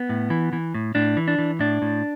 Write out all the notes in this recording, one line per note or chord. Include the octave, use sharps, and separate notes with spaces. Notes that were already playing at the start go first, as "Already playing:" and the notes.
Already playing: B3
A2
E3
E3
A2
A2 D4
E3
D4
E3
A2 D4
A2